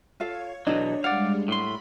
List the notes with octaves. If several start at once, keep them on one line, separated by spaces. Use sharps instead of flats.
F4 A4 C#5 F5
E2 B2 F#3 D4 A4 C#5 D#5
G3 G#3 D5 F5 F#5
A2 B5 C6